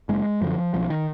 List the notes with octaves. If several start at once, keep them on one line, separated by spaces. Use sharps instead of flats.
F#1 G#3
F#2 D3 F3
B1 F3
D#3